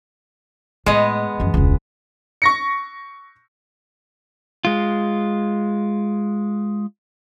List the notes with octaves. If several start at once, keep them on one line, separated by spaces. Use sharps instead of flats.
A2 G#3 B3 D#5
F#2 E3
E1 C#2
C#6 A#6 C#7
G#3 F4